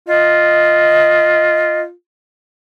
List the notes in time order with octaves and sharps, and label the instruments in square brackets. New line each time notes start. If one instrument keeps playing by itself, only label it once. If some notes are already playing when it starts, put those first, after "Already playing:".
[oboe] F4 [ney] D#5